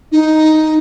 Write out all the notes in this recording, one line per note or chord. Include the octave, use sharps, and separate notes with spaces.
D#4